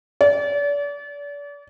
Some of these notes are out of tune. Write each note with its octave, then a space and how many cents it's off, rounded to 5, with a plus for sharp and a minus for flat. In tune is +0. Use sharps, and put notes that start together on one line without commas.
D5 -35